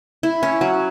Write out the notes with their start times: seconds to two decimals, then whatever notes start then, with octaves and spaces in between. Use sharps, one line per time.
0.23 E4
0.43 C#4
0.61 F#3